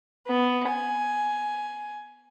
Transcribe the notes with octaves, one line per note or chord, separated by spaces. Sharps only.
B3
G#5